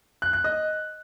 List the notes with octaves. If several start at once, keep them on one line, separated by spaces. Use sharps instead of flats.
F#6
F#6
D#5